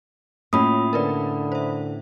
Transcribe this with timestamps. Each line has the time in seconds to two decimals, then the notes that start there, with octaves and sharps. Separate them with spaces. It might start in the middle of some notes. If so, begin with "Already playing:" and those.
0.53 A2 A#3 C#4 F4 B5 D#6
0.93 D3 A#4 B4 D5
1.52 C5 E5